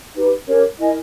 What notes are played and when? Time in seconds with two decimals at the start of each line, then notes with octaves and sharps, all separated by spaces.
0.15 D#4 G4 B4
0.48 C#4 G4 A#4 C#5
0.80 E4 A#4 D#5 G#5